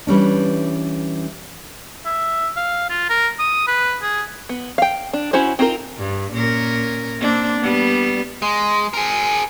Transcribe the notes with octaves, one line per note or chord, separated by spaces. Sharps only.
E3 G3 C#4 D4
E5
F5
F4
A#4
D#6
B4
G#4
B3
F5 G5
D4
C#4 E4 F#4 C5
C4 D#4 F4 G#4 A#4
G2
A#2 C#4 A#4
A#3 C4 D4
G3 B3
G#3
G#4 A#4